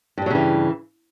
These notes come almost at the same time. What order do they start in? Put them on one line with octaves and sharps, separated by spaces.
G2 G3 F#3 C#3 E3